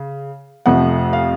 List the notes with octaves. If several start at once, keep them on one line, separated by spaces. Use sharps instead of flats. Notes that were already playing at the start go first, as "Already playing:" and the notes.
Already playing: C#3
F2 C3 F3 A3 F#5
F5